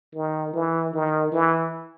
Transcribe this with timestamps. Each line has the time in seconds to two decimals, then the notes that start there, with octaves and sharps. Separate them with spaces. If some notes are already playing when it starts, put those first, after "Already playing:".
0.15 D#3
0.54 E3
0.94 D#3
1.32 E3